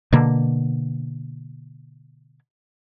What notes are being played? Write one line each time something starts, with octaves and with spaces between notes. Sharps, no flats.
B2 D3 A#3